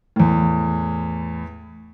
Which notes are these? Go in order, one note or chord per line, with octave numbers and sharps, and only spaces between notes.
E2 A2